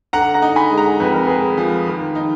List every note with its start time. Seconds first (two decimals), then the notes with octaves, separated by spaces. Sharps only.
0.13 D3 F#5 A#5
0.34 F#5 A#5
0.42 D#4
0.56 G#5 B5
0.71 G#3
0.78 F#5 A#5
1.00 F2 B4
1.14 A#4
1.27 G#3 G#4 B4
1.57 F3
1.87 D#3
2.15 D#4